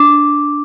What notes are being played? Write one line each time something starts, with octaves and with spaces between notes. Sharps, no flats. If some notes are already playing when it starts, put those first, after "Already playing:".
Already playing: D4 D6